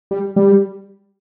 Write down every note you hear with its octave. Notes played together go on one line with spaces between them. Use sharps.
G3
G3